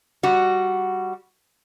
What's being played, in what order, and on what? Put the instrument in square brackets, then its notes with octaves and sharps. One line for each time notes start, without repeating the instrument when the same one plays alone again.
[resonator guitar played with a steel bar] G3 F#4